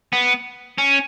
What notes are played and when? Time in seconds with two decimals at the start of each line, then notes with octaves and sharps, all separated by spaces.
0.13 B3
0.78 C#4